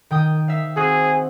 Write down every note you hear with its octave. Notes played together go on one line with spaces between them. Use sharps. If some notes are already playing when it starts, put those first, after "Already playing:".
D#3 G5 D#6
E5 F5
C4 F#4 G#4